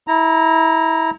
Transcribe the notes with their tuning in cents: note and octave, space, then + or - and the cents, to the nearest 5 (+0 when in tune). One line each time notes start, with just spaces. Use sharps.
E4 -25 A#5 +0